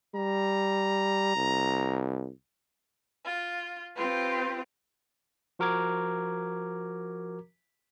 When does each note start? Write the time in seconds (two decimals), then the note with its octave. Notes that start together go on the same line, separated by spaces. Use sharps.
0.15 G3 A#5
1.36 C2
3.25 F4
3.95 C4 F4 G4 B4
5.59 F3 F#4 A#4 A#5 D6 G#6